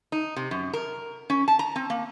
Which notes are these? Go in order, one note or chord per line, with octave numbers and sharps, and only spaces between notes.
D#4
C3
F#2
A#4
C#4
A5
A#5
C4
A#3